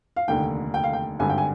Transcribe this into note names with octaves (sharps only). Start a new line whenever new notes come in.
F5
F1 D#2 D3 G5
G5
F5
G5
G#1 G2 D3 G#5
G5
G#5